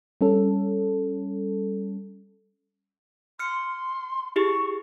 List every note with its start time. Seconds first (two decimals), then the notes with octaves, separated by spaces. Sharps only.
0.21 G3 C#4 A4
3.39 C6 F6 C#7
4.36 E4 G4 G#4 C#6